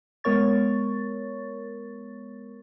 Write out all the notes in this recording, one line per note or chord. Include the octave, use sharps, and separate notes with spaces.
G#3 B3 A#4 C#5 C#6 A6